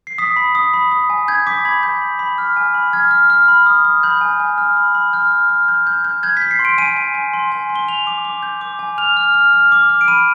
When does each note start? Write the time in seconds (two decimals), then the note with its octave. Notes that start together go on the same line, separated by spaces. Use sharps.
0.07 C7
0.18 D#6 B6
0.36 B5
0.55 D#6
0.74 B5
0.92 D#6
1.10 G#5
1.28 G6 G#6
1.47 D6 B6
1.65 B5 G#6
1.83 B5 G6
2.02 B5
2.19 B5
2.38 F6
2.57 G#5
2.74 B5
2.93 F6 G#6
3.11 F6
3.30 F6
3.48 B5
3.66 D#6
3.85 D#6
4.03 B5 G6
4.21 G#5
4.40 G#5
4.58 F6
4.77 B5
4.95 B5
5.13 F6 G6
5.31 F6
5.49 F6
5.68 G6
5.87 G6
6.04 G6
6.23 G6 G#6
6.37 G6 B6
6.51 C7
6.59 C6
6.65 D7
6.78 G#5 D#7
6.96 G#5
7.14 G#5
7.33 C6
7.52 G#5
7.69 C6
7.76 G7
7.88 G#5 F7
8.07 D6
8.25 D6
8.43 G6
8.61 D6
8.79 G#5
8.98 F6 F7
9.17 F6
9.34 F6
9.53 F6
9.72 D6
9.89 F6
10.01 D7
10.08 B5 D#7